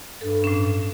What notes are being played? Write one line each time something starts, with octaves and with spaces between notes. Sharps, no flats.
G2 A4
A2 C#4